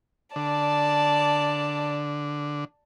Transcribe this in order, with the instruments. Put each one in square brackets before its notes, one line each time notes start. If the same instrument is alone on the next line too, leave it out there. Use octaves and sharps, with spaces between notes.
[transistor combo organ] D3 [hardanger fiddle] D5 A5